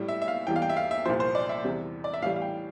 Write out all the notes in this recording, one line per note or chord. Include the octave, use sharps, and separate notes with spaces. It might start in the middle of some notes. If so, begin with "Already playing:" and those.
Already playing: A2 G3
E5
E5
F5
E2 E3 G3 G5
F5
G5
E5
F5
E5
C2 A#2 F3 C5
C5
D5
E5
E2 C3 G3
D5
E5
A2 E3 G3 F5
F5
G5